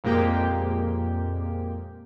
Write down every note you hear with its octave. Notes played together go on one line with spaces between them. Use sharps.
F2 A#2 G#3 A#3 G4 G5